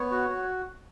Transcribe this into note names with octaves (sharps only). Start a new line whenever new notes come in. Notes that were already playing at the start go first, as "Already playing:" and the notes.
Already playing: B3 C#5
F#4
F#4